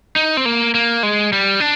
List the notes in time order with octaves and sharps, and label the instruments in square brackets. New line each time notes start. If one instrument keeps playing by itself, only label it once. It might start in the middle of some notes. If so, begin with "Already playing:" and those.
[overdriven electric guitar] D#4
C4
A#3
A#3
G#3
G3
D4